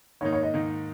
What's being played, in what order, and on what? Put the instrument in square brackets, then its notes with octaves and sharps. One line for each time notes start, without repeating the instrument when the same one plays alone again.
[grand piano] G#2 D#3 A#3 D#4 [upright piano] C#5
[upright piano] C#5
D#5
[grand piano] G#2 D#3 A#3 D#4